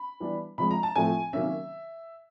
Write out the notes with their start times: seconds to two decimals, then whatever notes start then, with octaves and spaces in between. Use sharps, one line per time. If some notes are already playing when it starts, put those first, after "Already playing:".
Already playing: B5
0.20 E3 G3 B3 D4
0.58 C3 F3 G#3 B5
0.71 A#5
0.83 A5
0.96 A2 F3 A3 C4 G#5
1.33 C3 D#3 F#3 A#3 C#4 E5